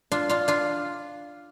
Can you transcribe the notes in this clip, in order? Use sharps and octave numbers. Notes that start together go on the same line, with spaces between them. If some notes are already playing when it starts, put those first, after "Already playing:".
D4 F4
D4 F4
D4 F4